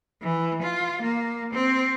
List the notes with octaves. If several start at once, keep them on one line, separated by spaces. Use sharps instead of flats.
E3
F4
A#3
C4